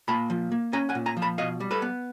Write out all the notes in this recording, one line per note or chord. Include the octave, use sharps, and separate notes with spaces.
A#2 A5 B5
F3
A#3
C#4 G#5 A#5
F#5 G#5
A#2
G#5 A#5
F3
A5 B5
B2 D#5 F5
G3
A4 B4
B3